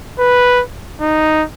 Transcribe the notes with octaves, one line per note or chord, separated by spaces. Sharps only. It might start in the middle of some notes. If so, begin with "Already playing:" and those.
B4
D#4